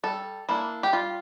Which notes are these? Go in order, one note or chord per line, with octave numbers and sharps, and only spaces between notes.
G3 A4
A#3 D4 E4
G4
G3 F4